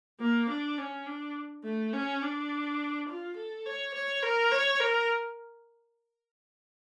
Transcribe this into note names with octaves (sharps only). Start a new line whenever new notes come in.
A#3
D4
C#4
D4
A3
C#4
D4
F4
A4
C#5
C#5
A#4
C#5
A#4